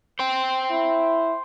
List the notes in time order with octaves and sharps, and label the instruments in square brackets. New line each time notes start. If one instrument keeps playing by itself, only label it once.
[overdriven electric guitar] C5 G5
[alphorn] E4